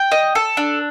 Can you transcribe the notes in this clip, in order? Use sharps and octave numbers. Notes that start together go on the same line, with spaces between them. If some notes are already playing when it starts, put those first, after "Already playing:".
Already playing: G5
D#5
A4
D4